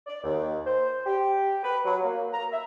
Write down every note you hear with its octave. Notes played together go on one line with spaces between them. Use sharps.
D5
D#2
C5
G4
B4
F#3
A#3
A#5
E5